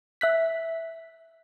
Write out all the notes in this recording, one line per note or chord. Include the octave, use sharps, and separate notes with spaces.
E5 F#6 B6